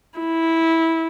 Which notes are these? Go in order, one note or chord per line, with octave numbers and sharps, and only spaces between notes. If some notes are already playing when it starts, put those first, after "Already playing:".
E4